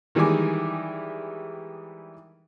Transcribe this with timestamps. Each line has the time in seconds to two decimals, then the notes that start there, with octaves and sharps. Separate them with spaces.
0.15 D#3 E3 G3 G#3 G#5 D6